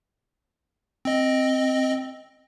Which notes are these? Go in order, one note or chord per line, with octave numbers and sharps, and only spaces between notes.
C4 D#5